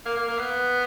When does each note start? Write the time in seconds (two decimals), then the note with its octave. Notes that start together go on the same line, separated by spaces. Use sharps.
0.06 A#3
0.17 A#3
0.28 A#3
0.39 B3